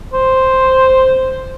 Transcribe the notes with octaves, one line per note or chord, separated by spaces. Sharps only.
C5